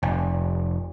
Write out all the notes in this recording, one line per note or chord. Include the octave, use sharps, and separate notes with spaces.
F1